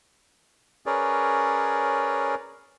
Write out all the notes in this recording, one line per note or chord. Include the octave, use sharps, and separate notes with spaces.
C#4 G#4 A#4 B4 C#5 D5